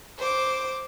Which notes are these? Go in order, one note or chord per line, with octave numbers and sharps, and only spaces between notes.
C5 D6